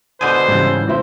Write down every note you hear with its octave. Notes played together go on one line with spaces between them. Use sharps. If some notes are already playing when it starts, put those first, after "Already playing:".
B2 D3 C5 G#5 D#6 D#7
G#2 C#3 E3 G3
F1 C4 E4 C5 E5